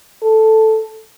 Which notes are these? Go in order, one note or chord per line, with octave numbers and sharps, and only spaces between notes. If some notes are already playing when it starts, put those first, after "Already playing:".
A4